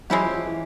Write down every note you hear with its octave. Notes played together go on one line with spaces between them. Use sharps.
F#3 G#3 C#4 E4 G4
F3
F3
E3